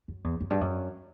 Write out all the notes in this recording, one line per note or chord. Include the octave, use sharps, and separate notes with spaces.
F#2
E2
F#2
G2
F#2